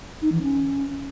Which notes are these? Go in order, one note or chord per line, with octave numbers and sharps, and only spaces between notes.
D#4
E3
C#4